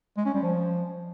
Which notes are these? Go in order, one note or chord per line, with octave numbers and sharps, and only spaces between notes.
G#3
C#4
G3
F3